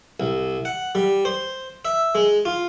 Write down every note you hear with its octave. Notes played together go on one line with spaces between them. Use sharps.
C2
F#5
G3
C5
E5
G#3
F4